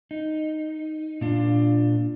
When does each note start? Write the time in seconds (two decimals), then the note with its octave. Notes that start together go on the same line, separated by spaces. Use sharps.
0.11 D#4
1.21 A#2 D4 F4